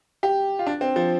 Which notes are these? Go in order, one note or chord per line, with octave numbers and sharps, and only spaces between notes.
G4
F4
D4
C4
F3